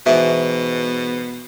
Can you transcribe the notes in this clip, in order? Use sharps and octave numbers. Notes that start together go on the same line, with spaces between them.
G#2 B2 E3 E5